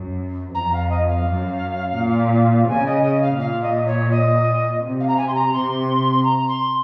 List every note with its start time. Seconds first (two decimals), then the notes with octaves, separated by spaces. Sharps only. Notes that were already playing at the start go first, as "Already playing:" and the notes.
Already playing: F#2
0.54 F2 A#5
0.72 F5
0.89 D#5
1.07 F5
1.26 F#2
1.97 A#2
2.67 C#3 G#5
2.86 D#5
3.03 D#5
3.22 F5
3.39 A#2 F5
3.62 D#5
3.86 C#5
4.11 D#5
4.82 C3
5.00 F5
5.08 A#5
5.17 G#5
5.28 C6
5.34 A#5
5.52 C3 C6
6.23 A#5
6.48 C6